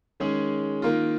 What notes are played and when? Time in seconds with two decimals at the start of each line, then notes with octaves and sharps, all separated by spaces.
0.20 D#3 G#3 C#4 G#4
0.82 D#3 A#3 F4